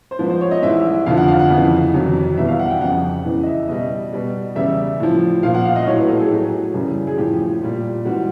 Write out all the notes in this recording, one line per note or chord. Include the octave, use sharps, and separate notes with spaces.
C5
G#2 F3 B4
C5
C#5
D#5
G#2 E3 G3 E5
F2 D3 F3 F5
F#5
F5
F#5
F2 C#3 E3
F2 C3 D#3 F#3
E2 B2 G3 E5
F5
F#5
G5
F2 C#3 F3 F#5
E2 C#3 E3
D#5
E5
B2 G3 D#5
B2 G3
E2 C#3 E3 G3 E5
A2 F3
A#2 F3 F5
F#5
F5
D#5
A2 F#3 C#5
B4
A4
G#4
A2 F#3 G4
F#2 C#3 E3 G3
G#4
A2 F3 G4
A#2 G3
G#2 E3 G3 F#4